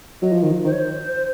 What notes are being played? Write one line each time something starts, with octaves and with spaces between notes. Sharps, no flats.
F#3 D#5
F3
D#3
F3
D#3 C5
C#5
C5